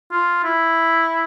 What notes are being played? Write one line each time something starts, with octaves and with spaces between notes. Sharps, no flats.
F4
E4